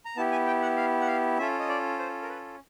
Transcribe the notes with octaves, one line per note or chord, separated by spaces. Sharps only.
A#5
B3 E4 G4 A5
G#5
G5
F#5
F5
F#5
F5
C#4 F4 A4 E5
D#5
D5
C5
A#4
B4